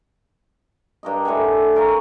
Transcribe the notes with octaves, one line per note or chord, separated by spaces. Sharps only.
G2 A#4 D#5
A2 D3 F#5 G#5
A#4 C#5 F5